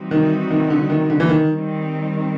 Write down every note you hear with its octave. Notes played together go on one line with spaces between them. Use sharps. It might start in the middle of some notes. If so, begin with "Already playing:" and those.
Already playing: E3 G3 C4 D#4 F#4
D#3
D#3
D3
D#3
D3
E3
D#3
D#3 G3 C4